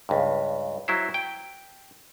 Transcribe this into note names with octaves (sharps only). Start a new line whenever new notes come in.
C#2 G2
F#3 E4 C5
G5